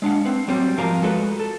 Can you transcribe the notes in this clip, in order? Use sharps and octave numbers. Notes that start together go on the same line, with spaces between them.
G#3 D4 F5 F#5
C4 B4
F#3 G3 C4
G#2 F3 A#4 F5 A#5
G#3 F#4 A4 B4
A4